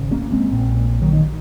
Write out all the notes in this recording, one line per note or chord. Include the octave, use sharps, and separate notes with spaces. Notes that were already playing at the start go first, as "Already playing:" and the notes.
Already playing: G#1 C#3
A#3 C#4
G#3 C4
A#1 A#2
D#3 F#3
D#3